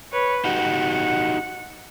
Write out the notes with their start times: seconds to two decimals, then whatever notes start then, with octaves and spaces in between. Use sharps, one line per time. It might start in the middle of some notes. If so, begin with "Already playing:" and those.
0.12 B4 C#5
0.45 D#4 F#4 G4 F#5